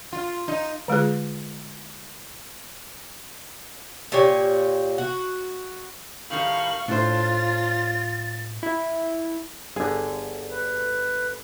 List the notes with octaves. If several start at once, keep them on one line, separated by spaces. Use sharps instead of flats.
F4
D#4
D3 G#3 F4 G#4
A#2 G4 C#5 G#5
F#4
A2 D#3 G3 F5 C#6 F#7
A2 D4 F4 C5 A6
E4
G1 D3 G#4
B4